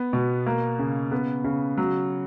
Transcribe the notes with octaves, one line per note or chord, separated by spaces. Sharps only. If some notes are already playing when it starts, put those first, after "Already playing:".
Already playing: B3
B2
A#3
C#3
B3
C#3
F#3